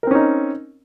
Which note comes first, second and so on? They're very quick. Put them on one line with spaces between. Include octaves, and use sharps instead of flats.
A#4 C4 C#4 D#4